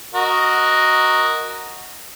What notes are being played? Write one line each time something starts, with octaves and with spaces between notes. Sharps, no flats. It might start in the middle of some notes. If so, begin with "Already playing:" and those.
F#4 A#4 D#5